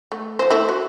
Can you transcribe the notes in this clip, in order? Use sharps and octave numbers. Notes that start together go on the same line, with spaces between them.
A3
F3 C5
A3 E4
F#4